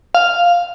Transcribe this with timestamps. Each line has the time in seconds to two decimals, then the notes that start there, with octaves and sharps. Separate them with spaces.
0.15 F5